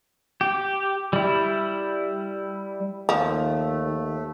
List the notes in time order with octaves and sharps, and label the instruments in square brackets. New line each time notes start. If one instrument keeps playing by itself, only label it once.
[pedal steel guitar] G4
G3 E4
[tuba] D#2 [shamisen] F3 [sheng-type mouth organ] A3